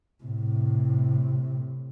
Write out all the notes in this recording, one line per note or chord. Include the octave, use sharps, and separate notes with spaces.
A2 C3